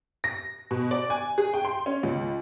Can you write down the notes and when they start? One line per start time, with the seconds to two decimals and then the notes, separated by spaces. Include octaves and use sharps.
0.24 A#6
0.71 B2
0.91 D5
1.10 G#5
1.38 G#4
1.54 G5
1.65 C6
1.86 C#4
2.03 C#2